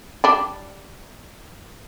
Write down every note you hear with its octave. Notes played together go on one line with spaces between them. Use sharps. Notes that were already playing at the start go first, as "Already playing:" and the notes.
G3 D4